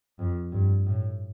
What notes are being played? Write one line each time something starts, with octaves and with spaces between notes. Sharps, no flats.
F2
G2
A2